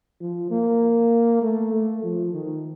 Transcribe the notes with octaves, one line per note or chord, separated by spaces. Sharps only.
F3
A#3
A3
A3
F3
D#3